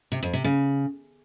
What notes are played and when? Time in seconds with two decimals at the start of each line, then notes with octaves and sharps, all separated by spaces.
0.12 C3
0.23 F2
0.33 C3
0.44 C#3